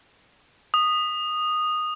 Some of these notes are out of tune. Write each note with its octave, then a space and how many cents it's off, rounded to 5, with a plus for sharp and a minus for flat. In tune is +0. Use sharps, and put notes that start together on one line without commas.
D#6 -10